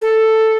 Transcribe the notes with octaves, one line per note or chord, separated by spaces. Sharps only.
A4